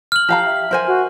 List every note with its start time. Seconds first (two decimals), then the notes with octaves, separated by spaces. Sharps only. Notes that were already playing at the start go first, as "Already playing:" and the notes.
0.12 F6 F#7
0.29 G4 F5 A5 A#5
0.46 E5
0.71 A#4 C5 G#5
0.87 F#4